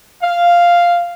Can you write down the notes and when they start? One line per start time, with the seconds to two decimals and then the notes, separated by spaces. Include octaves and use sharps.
0.23 F5